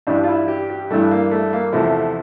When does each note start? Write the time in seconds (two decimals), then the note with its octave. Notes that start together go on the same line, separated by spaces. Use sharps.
0.07 G2 E3 G3 D4
0.23 F4
0.28 E4
0.48 G4
0.70 G4
0.91 G2 E3 G3 A3
1.11 A#3
1.31 A3
1.53 A#3
1.73 E2 C3 F3 A3